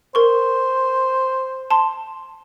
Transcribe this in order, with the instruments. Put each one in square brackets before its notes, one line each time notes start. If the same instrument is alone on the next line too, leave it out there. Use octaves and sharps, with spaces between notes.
[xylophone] A#4 C#6 [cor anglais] C5
[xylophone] A5 C6